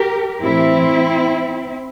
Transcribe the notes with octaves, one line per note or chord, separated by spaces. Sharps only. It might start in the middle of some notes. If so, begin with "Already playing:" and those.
Already playing: G4 A#4
A2 E3 C4 E4